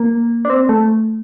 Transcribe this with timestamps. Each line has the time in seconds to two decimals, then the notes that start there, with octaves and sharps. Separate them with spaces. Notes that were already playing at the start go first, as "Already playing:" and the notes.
Already playing: A#3
0.45 D4
0.50 C4
0.69 A3